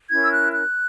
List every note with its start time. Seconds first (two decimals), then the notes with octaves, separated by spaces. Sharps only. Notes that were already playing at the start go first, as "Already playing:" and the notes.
0.10 C#4 E4 A#4 C#5 G#6
0.23 E6
0.32 F#6
0.53 F#6